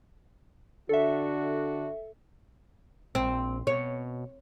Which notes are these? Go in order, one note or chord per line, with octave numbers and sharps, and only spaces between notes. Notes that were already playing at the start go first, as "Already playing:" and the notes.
D3 D4 F#4 A4 E5
A#1 C4
B2 C#5